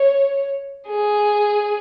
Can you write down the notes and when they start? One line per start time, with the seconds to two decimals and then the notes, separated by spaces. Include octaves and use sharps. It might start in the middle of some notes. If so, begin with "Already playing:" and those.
Already playing: C#5
0.89 G#4